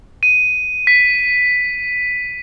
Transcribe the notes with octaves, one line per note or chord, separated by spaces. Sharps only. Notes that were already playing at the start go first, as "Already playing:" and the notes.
D#7
B6